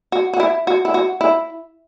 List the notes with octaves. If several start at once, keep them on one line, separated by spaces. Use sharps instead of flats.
F#4
F#4
E4
F#4
E4
F#4
E4